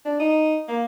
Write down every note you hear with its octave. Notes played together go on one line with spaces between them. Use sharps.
D4
D#4
A#3